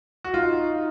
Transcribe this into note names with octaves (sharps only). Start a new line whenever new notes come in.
F#4
D#4 F4